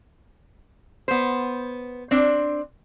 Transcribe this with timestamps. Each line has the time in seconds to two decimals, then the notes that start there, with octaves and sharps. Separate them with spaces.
1.08 B3 C5
2.11 C4 D4